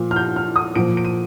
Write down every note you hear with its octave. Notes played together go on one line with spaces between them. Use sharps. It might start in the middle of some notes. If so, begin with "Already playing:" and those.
Already playing: A#2 F3
F6
G6
F6
D#6
A#2 F3 D7
D7
D#7